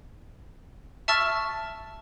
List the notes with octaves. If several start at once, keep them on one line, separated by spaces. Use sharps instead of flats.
E5 A5 C#6 E6 F6 A6